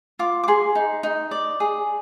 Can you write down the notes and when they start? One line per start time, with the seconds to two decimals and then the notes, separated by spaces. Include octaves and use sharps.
0.19 F4 D6
0.43 D6
0.48 G#4 C6
0.75 D#4
1.03 D#4
1.31 D5
1.60 G#4